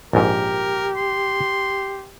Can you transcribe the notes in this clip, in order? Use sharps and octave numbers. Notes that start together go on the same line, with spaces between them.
A#1 G#2 G4 A#4
C6